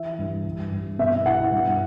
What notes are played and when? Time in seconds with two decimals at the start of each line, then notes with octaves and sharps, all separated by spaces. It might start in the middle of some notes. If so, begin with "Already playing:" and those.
Already playing: E3 E5
0.19 G2
0.45 G2
0.72 G2
0.99 B2 E5
1.26 E4 F#5
1.52 G2